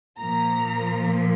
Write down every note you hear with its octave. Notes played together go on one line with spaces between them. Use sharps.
A#2 F3 A#3 A#5